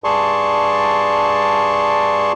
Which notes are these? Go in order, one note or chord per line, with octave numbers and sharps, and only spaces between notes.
G2 G#4 D5 A5 C6 C#6